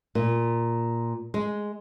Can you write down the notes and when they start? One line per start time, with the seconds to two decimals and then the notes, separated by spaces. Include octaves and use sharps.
0.15 A#2
1.34 G#3